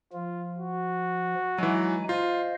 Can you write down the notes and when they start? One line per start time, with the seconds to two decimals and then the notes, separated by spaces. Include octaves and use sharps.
0.13 F3 F4
0.58 F#4
1.58 E3 F#3 G#3 D#4 G#5
2.09 F4 C5 D#5 F5